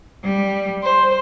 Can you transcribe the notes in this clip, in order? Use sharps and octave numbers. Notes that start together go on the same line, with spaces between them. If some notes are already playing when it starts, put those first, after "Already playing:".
G3
C5